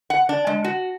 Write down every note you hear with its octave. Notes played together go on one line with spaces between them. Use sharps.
F#5
D4
G#3
F#4